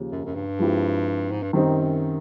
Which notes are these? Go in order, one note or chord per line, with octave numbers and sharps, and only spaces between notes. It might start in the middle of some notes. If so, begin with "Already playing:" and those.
Already playing: D#2 C#3 F3
F#2
F#2
G2
F3 G#3 C4 E4 G4
G#2
G2
F#2 D#3 G3 C4 D#4